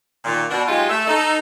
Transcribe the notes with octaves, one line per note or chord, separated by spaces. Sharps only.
A#2 D#3
B2 D4 F#4
F#3 G#3 D#4 F4 G4 G#4
A3 E5
D#4 A4